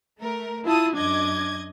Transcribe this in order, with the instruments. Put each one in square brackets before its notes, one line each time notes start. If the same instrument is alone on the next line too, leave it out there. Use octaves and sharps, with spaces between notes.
[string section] A3 A#4
[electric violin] E4 [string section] F4 A5 D#6
[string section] F#2 D#5 G#6 [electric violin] D4 D6